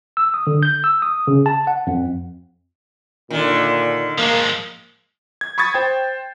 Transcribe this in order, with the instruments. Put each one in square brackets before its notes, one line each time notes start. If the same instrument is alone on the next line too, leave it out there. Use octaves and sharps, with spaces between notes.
[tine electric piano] E6
D#6
D3
G6
E6
D#6
C#3
A5
F#5
F2
[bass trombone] A#2 [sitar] D3 D#3
[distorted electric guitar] F3 G#3 [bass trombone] A#3
[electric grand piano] G#6
B5 C#6 D#6 G#6 A6
C5 G5